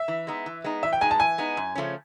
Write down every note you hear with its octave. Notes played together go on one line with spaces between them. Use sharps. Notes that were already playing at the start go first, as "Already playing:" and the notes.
Already playing: E5
E3
G#3 B3 D#4
E3
G#3 B3 D#4
E3 E5
G5
G#3 B3 D#4 G#5
A5
E3 G#5
G#3 B3 D#4
F#2
C#3 F3 A3 C#4